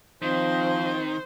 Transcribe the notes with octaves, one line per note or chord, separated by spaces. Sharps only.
D#3 F3 C4 C5